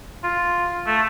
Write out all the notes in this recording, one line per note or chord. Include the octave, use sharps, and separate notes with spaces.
F4
A3